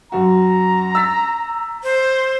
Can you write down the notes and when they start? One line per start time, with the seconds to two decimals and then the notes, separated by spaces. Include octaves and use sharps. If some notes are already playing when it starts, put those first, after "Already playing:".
0.12 F#2 F#4 A#5
0.95 E6 A6 B6
1.83 C5